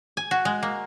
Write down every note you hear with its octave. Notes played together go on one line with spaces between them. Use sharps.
G#5
F#4
G#3
A#3